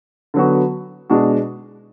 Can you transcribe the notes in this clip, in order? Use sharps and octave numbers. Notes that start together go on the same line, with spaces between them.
D3 F#3 B3 F#4
B2 G#3 D4 F#4